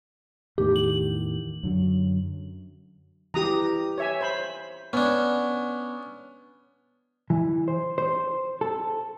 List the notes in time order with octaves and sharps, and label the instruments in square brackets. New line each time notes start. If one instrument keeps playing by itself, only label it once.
[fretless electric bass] E2 A2 D#3 [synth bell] G4
[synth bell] F#7
[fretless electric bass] F#2 D3 F#3
[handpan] E3 G4 [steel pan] A#5 D#6
[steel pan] C#5 E5 G#5
C5 B5
[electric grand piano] B3 [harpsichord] C#4 D4
[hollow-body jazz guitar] E3
C5
C5
A4